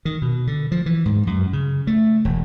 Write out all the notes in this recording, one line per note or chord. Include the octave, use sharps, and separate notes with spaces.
D#3
B2
D3
F3
E3
G#2
F#2
C#3
A3
E1